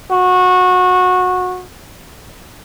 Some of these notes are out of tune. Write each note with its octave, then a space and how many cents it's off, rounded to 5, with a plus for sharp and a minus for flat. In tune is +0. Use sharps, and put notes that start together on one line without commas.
F#4 -20